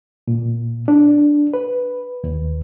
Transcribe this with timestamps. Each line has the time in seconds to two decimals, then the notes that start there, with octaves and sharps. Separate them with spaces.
0.28 A#2
0.88 D4
1.54 B4
2.24 D#2